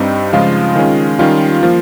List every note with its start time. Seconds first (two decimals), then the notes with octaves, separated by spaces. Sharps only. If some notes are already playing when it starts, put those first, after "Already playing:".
Already playing: G2 G3 C4 D#4 D#5
0.33 C#3 F3 G#3 F4 F5
0.76 D#3 G#3 C#4
1.19 D#3 G3 C#4 F4 F5
1.63 F3 A#3